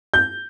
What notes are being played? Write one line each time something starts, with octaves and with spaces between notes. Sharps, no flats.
G6